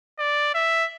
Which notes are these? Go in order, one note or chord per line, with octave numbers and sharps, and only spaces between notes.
D5
E5